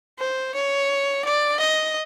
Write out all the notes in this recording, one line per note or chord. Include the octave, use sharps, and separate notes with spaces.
C5
C#5
D5
D#5